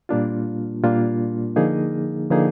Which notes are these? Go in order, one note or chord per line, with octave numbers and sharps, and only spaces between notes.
A#2 G3 A#3 D4 F4
A#2 G3 A#3 D4 F4
D3 F3 A#3 D#4 G#4
D3 F3 A#3 D#4 G#4